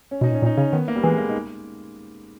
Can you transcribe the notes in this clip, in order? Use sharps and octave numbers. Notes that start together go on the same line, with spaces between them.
C#4
B2 D#4
A#2
C#4
A#2
D#4
C#3 C#4
D#3 B3
A#3
G3
E3 G#3
A#3
D#4